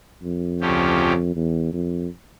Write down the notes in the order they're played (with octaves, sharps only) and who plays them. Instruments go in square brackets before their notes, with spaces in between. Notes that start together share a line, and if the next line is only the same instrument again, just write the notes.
[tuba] F2
[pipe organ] D2 C#3 F3 C#4 G4
[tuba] E2
F2